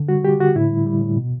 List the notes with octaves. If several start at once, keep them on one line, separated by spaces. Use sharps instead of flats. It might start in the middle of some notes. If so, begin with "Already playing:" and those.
Already playing: D3
G3 F#4
G3 G4
D3 F#4
A2 E4
G3
G3
A2
B2